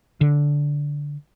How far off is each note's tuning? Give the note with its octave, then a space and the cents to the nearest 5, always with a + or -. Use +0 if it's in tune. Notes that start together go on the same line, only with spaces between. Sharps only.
D3 -10